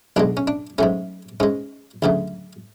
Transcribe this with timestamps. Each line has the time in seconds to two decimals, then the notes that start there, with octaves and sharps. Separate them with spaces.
0.16 B1 B2 G#3 D4
0.37 C#4
0.47 D4
0.78 G#2 F#3 A3 C#4
1.40 G#2 G#3 C#4
2.02 D2 C#3 F#3 A3